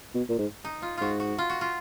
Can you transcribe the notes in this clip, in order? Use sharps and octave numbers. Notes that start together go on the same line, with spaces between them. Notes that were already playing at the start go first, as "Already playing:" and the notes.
B2
A#2
G#2
D#4
F4
G#2 F4 F#4
F#4
F4
F#4
F4